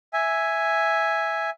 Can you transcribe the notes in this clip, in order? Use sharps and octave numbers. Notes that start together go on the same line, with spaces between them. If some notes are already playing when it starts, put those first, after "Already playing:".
E5 G#5